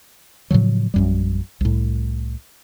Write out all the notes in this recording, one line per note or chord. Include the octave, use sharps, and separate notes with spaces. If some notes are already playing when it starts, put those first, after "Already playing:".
A2 C#3 F3 F#3
A#1 F#2 G3
C2 A2